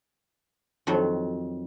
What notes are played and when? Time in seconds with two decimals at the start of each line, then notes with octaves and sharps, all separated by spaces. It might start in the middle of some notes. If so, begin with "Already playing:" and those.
0.87 F2 D#3 F#3